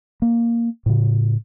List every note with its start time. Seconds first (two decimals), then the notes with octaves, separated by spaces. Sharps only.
0.22 A#3
0.86 A2 C#3